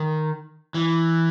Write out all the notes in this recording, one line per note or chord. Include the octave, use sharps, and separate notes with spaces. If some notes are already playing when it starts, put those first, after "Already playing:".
Already playing: D#3
E3